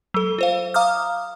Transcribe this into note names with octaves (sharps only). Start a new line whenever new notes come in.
F#3 A4
F4 C5 F5
F5 A#5 D6 D#6 F6